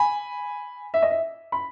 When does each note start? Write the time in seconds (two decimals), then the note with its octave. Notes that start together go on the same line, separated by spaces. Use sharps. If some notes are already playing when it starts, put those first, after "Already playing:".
Already playing: G#5 B5
0.94 E5
1.03 D#5
1.11 E5
1.52 B5